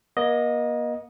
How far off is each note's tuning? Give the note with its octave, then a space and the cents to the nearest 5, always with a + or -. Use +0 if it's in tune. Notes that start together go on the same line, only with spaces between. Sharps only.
A#3 +40 D#5 +0